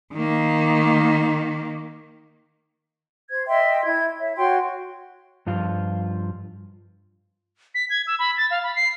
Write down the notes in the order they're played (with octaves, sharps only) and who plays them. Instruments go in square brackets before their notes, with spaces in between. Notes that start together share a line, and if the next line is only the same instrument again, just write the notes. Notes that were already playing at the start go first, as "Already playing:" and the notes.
[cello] D#3 A#3
[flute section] C5 G#6
D#5 E5 G5 C6
E4 G#6
C#5 E5
F#4 C#5 G5 C6
[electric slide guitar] G2 F3 F4
[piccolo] B6
G#6
E6
B5
A6
F5
B5
C7